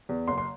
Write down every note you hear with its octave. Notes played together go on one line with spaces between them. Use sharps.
E2
F#1 C6
C6